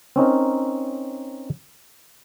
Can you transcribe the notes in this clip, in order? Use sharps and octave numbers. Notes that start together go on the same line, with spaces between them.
C4 C#4 D#4 A#4